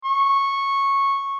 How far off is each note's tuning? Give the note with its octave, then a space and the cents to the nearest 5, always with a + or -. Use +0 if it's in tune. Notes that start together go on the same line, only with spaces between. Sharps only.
C#6 -10